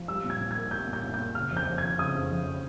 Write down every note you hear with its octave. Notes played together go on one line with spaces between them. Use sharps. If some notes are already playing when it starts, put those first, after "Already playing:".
Already playing: F3
G3 E6
A#2
G#6
A#2
A#3 G#6
G3 G6
A#2
G6
A#2
G6
A#3
C#3 F6
F2
G6
F2
G#6
F3
C#3 D#6
F2
F2
F3